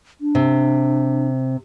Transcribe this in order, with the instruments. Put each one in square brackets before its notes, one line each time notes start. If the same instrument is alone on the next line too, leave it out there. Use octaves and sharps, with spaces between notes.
[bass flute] D4
[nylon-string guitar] C3